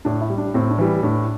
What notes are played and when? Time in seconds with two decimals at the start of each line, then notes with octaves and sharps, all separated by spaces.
0.05 A2 D4
0.21 E4
0.30 G3
0.38 D4
0.54 A2 C4
0.71 D4
0.78 E3 G3
1.03 A2 D4